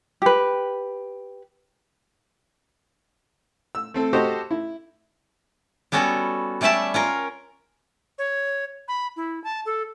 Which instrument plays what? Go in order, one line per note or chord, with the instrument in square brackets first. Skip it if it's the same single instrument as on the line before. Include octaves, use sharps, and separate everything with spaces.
[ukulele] G4 B4
[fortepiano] E6
A3 C4 A4
F#4 G4 A4 C5 D#5
E4
[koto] G3 B3 C#4 F#4 A4
G3 A3 C#4 D5 E5 A5
C#4 F4 A#4
[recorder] C#5
B5
E4
A5
A4